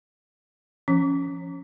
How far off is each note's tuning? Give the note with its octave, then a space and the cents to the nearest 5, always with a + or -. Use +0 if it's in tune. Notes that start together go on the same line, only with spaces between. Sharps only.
F3 -25 C#4 +0